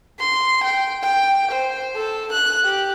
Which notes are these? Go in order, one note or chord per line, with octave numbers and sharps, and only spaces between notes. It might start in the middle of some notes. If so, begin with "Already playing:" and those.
C6
G5
G5
C5
A4
F#6
G4